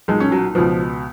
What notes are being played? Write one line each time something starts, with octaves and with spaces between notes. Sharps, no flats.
B1 A#2 G#3
C#4
F#3
C#2 B2 F3